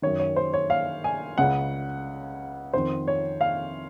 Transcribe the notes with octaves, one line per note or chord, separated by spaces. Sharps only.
F#2 D#3 C#5
C#5
C5
C#5
F5
G#5
C#2 C#3 F#5
F2 D#3 C5
C#5
F5